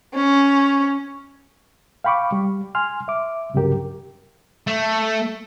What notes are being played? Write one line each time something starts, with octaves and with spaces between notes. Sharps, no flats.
C#4
F5 G5 B5 C#6 D6
G3
G#5 C6 F6
E5 D6
C2 G2 C#3 F#3 G4 A#4
A3